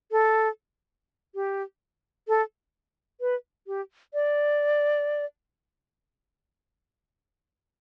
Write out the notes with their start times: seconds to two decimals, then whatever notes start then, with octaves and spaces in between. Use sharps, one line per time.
0.12 A4
1.35 G4
2.28 A4
3.21 B4
3.67 G4
4.14 D5